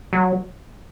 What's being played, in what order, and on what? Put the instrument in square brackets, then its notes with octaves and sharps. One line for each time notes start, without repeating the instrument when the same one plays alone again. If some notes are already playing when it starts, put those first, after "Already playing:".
[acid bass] F#3